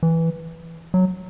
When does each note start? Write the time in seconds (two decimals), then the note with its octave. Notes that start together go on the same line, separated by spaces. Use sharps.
0.03 E3
0.94 F#3